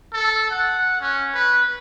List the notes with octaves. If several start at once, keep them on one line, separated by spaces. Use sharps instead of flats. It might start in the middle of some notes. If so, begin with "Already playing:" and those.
A4
F#5
C#4
B4